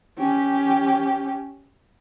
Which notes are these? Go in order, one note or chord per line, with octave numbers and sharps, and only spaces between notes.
C#4 G4